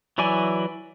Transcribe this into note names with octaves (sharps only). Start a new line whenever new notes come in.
E3 F#3 E4 D5 G#5